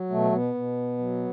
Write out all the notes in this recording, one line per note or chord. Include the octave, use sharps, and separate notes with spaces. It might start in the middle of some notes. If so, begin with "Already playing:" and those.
Already playing: F#3
B2 A3
B2 B3
B2
F#3